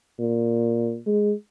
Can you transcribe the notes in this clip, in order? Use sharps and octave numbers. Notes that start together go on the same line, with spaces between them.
A#2
G#3